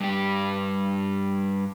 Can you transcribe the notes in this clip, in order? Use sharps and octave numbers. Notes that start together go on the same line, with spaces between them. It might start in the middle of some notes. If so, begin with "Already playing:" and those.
G2 G4